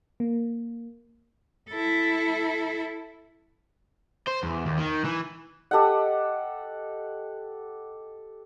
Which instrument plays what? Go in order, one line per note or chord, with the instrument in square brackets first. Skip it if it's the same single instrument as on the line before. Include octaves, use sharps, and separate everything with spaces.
[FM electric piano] A#3
[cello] E4 A4
[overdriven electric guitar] C5
E2
D#2
D#3
E3
[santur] G4 A4 D#5 F#5